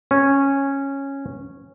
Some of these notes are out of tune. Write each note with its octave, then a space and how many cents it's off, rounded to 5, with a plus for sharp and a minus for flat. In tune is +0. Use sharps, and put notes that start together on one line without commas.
C#4 -10